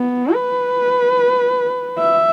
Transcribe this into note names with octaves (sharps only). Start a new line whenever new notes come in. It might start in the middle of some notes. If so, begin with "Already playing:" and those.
Already playing: B3
B4
E5